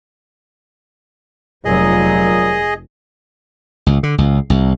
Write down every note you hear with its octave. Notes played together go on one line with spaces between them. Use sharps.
F1 D#2 A#2 F#3 G#4 D#5
C#2
D3
C#2
C2